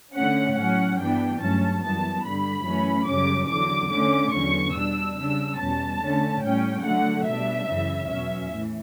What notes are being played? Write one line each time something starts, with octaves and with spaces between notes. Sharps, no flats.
D3 A3 C#4 F#5
A2 F#3 C#4 F#5
G2 E3 G3 B3 D4 G5
G2 F#3 A3 C#4 A5
F#2 E3 G3 B3 A5
G2 D3 G3 B5
F#2 E3 A3 C#4
F#2 C#3 G3 C#4 D6
E2 D3 F#3 D6
D3 A3 C#4 D6
E2 D3 F#3 C#4 C#6
B2 G3 D4 E6
C#3 G3 D4 E6
E2 B2 G3 C#4 A5
D3 A3 C#4
A2 G3 C#4 G5
D3 F#3 A3 F#5
B2 G3 D4 E5
F#2 C#3 E3
E2 B2 F#3 C#4 E5
A2 E3